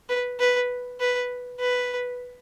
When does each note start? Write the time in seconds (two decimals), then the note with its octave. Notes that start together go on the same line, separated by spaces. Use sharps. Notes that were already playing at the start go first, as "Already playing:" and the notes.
0.09 B4
0.40 B4
1.00 B4
1.60 B4